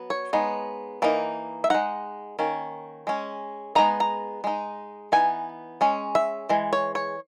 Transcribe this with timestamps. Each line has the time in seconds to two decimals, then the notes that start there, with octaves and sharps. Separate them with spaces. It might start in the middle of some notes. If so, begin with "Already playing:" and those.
Already playing: F#3 B3
0.10 C#5
0.33 G#3 B3 D#4
1.02 E3 A#3 D#4
1.64 E5
1.70 G#3 D#4 F#5
2.39 D#3 A#3 C#4
3.07 G#3 C#4
3.75 G#3 B3 D#4 A#5
4.00 A#5
4.44 G#3 D#4
5.12 E3 B3 D#4 G#5
5.81 G#3 C#4
6.15 E5
6.49 E3 G#3
6.73 C#5
6.95 C#5